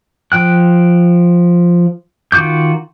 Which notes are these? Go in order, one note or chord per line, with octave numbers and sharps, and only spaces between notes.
F3 G5 F#6
D#3 F4 F#4 D6 G6